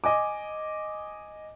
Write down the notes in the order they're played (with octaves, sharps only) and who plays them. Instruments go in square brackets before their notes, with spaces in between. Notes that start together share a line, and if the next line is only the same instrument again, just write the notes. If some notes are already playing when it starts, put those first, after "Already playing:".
[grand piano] D#5 G#5 D6